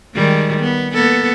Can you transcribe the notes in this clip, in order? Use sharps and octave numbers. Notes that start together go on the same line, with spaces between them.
D#3 G3 G#3
B3
A#3 B3 A4